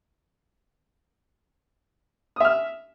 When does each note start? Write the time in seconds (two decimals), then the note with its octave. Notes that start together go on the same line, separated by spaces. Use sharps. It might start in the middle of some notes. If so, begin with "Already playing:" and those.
2.36 D#6
2.40 E5
2.45 F6